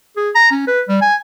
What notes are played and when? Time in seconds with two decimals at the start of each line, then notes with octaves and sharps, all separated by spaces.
0.17 G#4
0.35 A#5
0.51 C#4
0.68 B4
0.88 G3
1.02 G#5